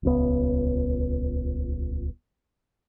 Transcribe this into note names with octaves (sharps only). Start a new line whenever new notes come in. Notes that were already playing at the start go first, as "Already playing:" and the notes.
D#1 C#2 B3